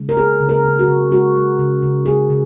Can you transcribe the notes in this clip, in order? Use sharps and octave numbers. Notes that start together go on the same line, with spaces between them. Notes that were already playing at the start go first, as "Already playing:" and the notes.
Already playing: C#3 G#3
A#4
B3 G#4
C#3
A#4
C#3
F#4
C#3
G#3 F#4
G#3
C#3
C#3
G#3 G#4
C#3